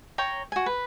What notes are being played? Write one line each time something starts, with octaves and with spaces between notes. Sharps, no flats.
C#5 G5 A#5
F#4 G#5
B4